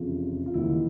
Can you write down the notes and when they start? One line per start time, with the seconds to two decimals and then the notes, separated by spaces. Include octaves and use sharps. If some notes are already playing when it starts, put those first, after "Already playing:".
Already playing: F1 E2 C#3 F4
0.46 F4
0.54 E1 D#2 D#3 F#3 E4